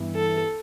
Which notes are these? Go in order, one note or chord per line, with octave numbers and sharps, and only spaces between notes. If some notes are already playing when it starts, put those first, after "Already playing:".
Already playing: G2 E3 B3 E4
A4